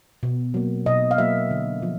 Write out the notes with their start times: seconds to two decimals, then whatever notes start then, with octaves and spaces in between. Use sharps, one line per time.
0.23 B2
0.54 F#3 A#3
0.86 B2 D#5
1.11 F5
1.18 F#3 A#3 E5
1.51 D3
1.82 F3